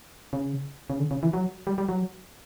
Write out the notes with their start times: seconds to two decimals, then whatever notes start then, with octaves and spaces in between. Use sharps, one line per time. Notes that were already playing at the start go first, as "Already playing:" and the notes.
0.33 C#3
0.90 C#3
0.99 D3
1.11 C#3
1.23 E3
1.33 F#3
1.67 G3
1.78 G3
1.89 F#3